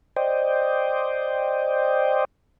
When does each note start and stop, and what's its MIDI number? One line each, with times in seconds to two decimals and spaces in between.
0.16 2.25 72
0.16 2.25 74
0.16 2.25 75
0.16 2.25 79